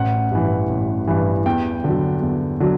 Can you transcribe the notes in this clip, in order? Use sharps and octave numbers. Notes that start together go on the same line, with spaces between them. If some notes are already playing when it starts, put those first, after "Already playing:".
Already playing: A1 F#5
G2 E3
A1
G2 E3
E2 G5
D3 F#3
E2
D3 F#3